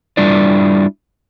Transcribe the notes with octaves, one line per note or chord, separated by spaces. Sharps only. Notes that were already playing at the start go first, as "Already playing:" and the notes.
G3 D4 E4 F4 D5